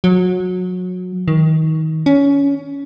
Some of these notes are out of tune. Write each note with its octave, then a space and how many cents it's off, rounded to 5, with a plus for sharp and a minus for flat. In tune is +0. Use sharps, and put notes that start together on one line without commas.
F#3 -25
D#3 +25
C#4 +20